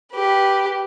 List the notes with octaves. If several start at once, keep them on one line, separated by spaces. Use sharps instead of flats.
G4 B4